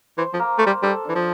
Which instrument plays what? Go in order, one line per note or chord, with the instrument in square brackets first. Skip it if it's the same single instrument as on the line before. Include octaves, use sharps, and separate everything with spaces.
[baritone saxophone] E3 [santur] C5
[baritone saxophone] F3
[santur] A#3
[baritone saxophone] A3 [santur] C5
[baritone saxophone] G3
[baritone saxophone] G3 [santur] A4
[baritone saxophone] E3 [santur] D4
[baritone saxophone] F3